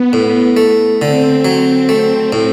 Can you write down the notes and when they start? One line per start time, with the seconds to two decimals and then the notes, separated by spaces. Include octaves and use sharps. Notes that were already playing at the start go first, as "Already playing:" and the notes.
Already playing: B3
0.13 A2
0.57 A3
1.00 D3 C4
1.45 F#3
1.89 A3
2.33 A2